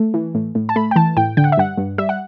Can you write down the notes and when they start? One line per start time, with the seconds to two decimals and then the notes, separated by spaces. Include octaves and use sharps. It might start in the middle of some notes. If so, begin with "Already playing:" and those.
Already playing: A3
0.14 E3
0.35 A2
0.55 A2
0.69 A5
0.76 A3 B5
0.91 G5
0.96 E3 A5
1.17 A2 G5
1.37 D3 G5
1.44 F#5
1.52 E5
1.57 G2 F#5
1.78 G2
1.98 G3 E5
2.09 F#5